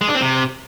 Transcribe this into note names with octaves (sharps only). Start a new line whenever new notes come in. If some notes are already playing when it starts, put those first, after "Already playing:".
G#3
D4
C4
C3